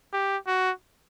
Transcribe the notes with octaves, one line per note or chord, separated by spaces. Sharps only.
G4
F#4